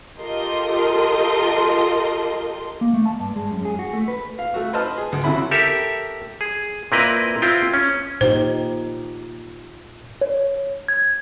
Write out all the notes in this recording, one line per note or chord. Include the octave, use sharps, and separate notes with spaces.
F4 G4 A4 A#4 D#5 C6
A#3
A3
A5
G2
G#3
F#2
G#4
F#4
A3
B4
F5
A3 F#4
B4 C5 D#5 A5 C6 F6
G#4
D2
F2 C3 F#3 C#4 E4 B5
G4 A4 A#4 E5
G#4
A#2 C4 E4 A#4 B4 D#5
C4 E4 F4 G5
C#4
A#2 D#4 G4 C5
C#5
G#6